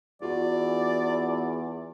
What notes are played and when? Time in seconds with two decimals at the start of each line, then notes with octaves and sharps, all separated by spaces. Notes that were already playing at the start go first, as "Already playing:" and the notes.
0.22 E2 F4 F#4 D5